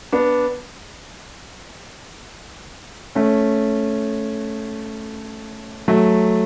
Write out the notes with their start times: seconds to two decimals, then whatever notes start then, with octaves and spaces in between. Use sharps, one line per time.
0.12 B3 D4
3.15 A3 C#4
5.88 F#3 A3